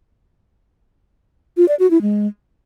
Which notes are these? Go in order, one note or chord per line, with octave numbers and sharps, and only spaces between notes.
F4
D5
F#4
E4
G#3